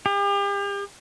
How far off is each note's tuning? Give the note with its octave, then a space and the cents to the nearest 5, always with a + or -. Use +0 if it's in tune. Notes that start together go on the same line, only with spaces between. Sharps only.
G4 +40